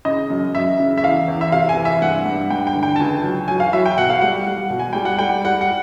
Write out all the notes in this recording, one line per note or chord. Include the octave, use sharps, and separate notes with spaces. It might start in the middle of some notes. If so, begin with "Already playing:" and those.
C#3 D#5
F#2
F#2 E5
C#3
E5
E2 F5
E2
E5
C3 F5
G#5
E3
E5
G2 F#5
G2
G2 G5
G5
D3
G5
A5
C#2 G#5
F#3
F#3 G#5
F5
F#3 E5
G5
B2 F#5
F5
G3 F#5
G3
B2
G#5
G3 G5
F#5
G3 G5
G3 F#5
F#5